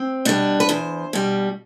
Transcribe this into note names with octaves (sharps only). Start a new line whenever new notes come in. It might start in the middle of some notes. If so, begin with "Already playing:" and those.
Already playing: C4
B2 G3 D4
B4
E2 C5
B2 G3